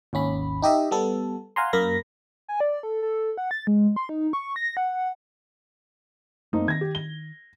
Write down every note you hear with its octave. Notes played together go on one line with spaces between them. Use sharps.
G#1 D#2 C#4 B5
D#4 G4 D#5 E5
G3 B3 A4
F5 F#5 G#5 A#5 C6
F#2 A#3 A#4 B5 A#6
G#5
D5
A4
A4
F#5
A6
G#3
C6
D#4
C#6
A#6
F#5
F#2 A3 A#3 C4 D#4
D#3 G#6 A#6
G4
G7